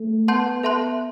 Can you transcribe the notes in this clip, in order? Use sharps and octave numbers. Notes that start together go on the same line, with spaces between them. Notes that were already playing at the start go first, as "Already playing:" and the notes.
Already playing: A3
B3 F#5 A5 C6 G6
A4 E5 A5 C6 F#6